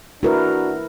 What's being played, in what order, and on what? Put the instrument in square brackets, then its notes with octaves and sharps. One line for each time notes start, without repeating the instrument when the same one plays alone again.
[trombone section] D4 F#4 [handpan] E4 A#4 B4